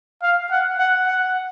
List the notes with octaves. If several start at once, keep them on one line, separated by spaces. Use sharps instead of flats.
F5
F#5
F#5
F#5